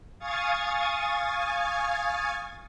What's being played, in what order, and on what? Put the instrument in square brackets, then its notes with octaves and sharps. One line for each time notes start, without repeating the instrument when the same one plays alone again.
[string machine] F5 G#5 C#6 D#6 G#6 A6